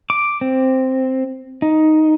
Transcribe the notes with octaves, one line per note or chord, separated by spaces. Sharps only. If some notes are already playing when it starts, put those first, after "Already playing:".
D6
C4
D#4